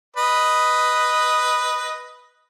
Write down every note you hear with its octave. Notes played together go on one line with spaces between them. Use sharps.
B4 D#5